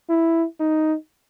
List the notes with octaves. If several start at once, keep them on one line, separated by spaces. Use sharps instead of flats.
E4
D#4